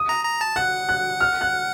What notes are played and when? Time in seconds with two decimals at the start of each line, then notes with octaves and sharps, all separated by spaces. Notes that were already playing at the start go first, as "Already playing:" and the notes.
Already playing: D#6
0.09 A#5
0.25 A#5
0.41 A5
0.56 F#5 F#6
0.89 F#6
1.21 F6
1.41 F#6